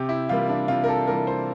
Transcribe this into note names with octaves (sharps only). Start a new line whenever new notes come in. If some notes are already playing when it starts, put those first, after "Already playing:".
Already playing: C3 G4
E4
E3 G3 A#3 F4
D4
C3 F4
A#4
A4
E3 G3 A#3 A#4
C5